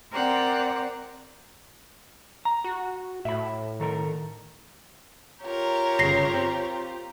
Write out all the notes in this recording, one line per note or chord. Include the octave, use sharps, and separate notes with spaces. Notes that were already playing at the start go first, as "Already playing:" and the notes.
C4 A#4 C5 D5 F#5 G5
A#5
F#4
A2 E5 B5
D#3 A4 A#4
F4 G4 A#4 C#5 A#5
G1 C#3 A#6 C7
C4